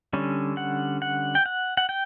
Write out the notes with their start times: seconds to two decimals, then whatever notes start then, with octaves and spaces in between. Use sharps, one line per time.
0.13 D3 G3 C#4
0.57 F#5
1.02 F#5
1.35 G5
1.46 F#5
1.77 F#5
1.89 G5